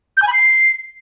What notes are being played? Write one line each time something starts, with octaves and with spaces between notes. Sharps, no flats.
G6
G#5
B5
C7